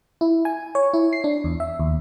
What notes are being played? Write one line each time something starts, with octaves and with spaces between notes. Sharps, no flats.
E4
G#5
C#5
E4
C7
D4
E2
E5
D#2